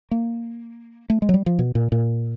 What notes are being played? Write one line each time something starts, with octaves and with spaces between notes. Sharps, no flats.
A#3
A3
G#3
F#3
G3
F3
B2
A#2
A#2